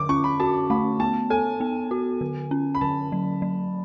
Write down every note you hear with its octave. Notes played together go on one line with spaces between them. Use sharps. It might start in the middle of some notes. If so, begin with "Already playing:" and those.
Already playing: D3 D6
C#4 C#6
B5
F#4 A5
A3 B5
B3 A5
A4 G#5
B3
F#4
D3
C#4
B5
D3 A5
F#3
F#3